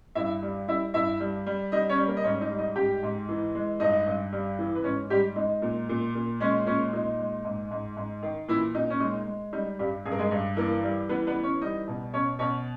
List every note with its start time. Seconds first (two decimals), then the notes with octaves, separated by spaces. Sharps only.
0.15 G2 E4 E5
0.42 G3
0.67 G3 E4 E5
0.94 G2 E4 E5
1.20 G3
1.46 G3
1.72 G3 D#4 D#5
1.89 C#4 C#5
1.98 G3
2.07 A#3 A#4
2.17 D#5
2.24 G#2 C#4 C#5
2.41 D#4 D#5
2.51 G3
2.59 D#4 D#5
2.76 G#2 G4 G5
3.03 G#2
3.29 E3
3.55 G#3
3.80 G2 D#4 D#5
4.07 G2
4.33 G3
4.59 E3
4.75 B4
4.84 G#2 C#4 C#5
5.10 G#2 G3 G4
5.36 G#3 D#4
5.62 A#2
5.89 A#2
6.15 A#2
6.40 G#3 C#4
6.66 A#2 C#4
6.93 A#2 D#4
7.19 G#3
7.45 G#2
7.71 G#2
7.97 G#2
8.23 D#3
8.48 A#2 E3 E4
8.75 A#2 D#4
8.90 C#4
9.00 G#3 D#4
9.27 G#3
9.53 G3 D#4
9.79 G2 G3 G4
10.05 G2 G#4
10.12 A#4
10.19 G#3 G#4
10.31 G2
10.57 E3 A#3 A#4
10.83 G3
11.09 E3 B3 B4
11.27 B3 B4
11.35 E3
11.43 C#4 C#5
11.61 G3 D#4 D#5
11.88 B2
12.13 B2 C#4 C#5
12.39 B2 C#4 C#5